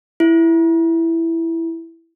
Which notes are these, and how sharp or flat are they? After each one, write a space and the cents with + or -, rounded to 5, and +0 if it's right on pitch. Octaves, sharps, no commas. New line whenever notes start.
E4 +5